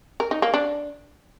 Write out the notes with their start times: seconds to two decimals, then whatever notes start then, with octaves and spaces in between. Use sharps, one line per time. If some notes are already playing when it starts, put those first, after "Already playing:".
0.20 A#4
0.31 D#4
0.42 A#3
0.54 D4